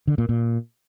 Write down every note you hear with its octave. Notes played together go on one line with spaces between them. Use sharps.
D3
A#2
A#2